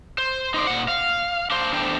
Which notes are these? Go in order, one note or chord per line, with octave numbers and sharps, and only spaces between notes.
C5
D#4 C5 D5
A#2 F#5
F5
D4 C5
E2 A3 D4 C5 G5